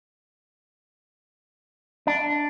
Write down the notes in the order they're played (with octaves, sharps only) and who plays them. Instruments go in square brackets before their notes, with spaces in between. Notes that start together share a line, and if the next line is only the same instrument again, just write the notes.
[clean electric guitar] D4